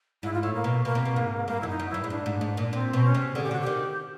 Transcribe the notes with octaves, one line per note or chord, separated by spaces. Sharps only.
G#2 E4
F4
A2 E4
A#3
B2
B2 A#3
C3
B2
G#2
G2 A#3
F#2 E4
D#4
F#2
E4
G2
G#2
G2 D4
G#2
G#2
A#2
A#2 C4
B2
C#4
C3
D3 G#4
G4
D3 F#4
G4
D#3